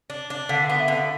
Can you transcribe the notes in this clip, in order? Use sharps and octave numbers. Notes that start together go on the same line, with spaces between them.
D4
D4
D3 F5
F5
B3
E5
D3
F5